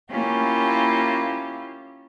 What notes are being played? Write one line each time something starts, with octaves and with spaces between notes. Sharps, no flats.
A#3 C#4 E4 F4 G4